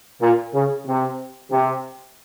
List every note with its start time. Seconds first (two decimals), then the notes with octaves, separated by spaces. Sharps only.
0.21 A#2
0.53 C#3
0.86 C3
1.51 C3